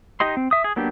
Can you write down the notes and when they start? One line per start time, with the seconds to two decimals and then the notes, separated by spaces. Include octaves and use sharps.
0.20 D#4 G4 D#5 C6
0.37 C4
0.51 E5 D#6
0.64 G#4
0.76 F#3 A#3 B3 D4 G4